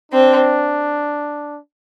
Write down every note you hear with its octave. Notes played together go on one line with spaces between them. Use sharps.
C4 D4